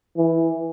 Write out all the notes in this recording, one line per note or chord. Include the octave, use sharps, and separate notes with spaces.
E3